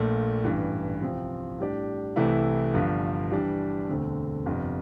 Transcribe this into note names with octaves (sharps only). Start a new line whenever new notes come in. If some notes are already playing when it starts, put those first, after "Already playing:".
Already playing: A#1 A#2 A3
A1 G2 E3
C2 C3 F3 C4 F4
A2 G3 D4 G4 D5
C2 C3 E3 A3 E4
G1 G2 F3
E3 G3 D4
E1 D2 D3 A3 C4
G1 F2 C3